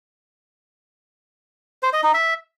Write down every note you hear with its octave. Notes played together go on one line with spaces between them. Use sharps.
C5
D#5
D#4
E5